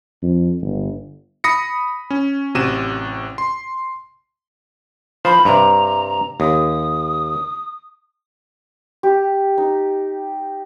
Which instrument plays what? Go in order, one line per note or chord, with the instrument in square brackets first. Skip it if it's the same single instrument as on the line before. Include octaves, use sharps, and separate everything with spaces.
[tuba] F2
G1
[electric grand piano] B5 D#6 A#6 C#7
C#4
A1 C3 F#4 D#7 E7
C6
[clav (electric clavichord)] F3 C5 [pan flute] B5
[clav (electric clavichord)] G2 C3 [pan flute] A#5
[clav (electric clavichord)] D#2 [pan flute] D#6
[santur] G4
D#4